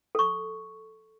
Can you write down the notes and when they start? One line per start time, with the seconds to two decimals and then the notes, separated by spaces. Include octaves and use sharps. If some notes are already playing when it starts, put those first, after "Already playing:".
0.15 A4 C#6